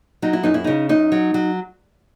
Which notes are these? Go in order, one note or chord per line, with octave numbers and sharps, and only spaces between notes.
F#3 D#4
E4
F#2 D#4
E4
C#3 D#4
F#2 D#4
F#3
F#3